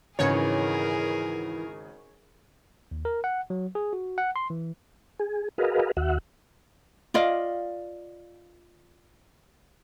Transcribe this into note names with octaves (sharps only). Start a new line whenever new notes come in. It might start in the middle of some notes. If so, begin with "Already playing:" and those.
G#1 C#3 E3 D#4 G#4 A#4 C#5
D#2
A#4
F#5
F#3
G#4
F#4
F#5
C6
E3
G#4
F#4 G#4 A#4 B4 D#5 F5
D#2 F#4 E5 F#5
F4 D5 D#5 F5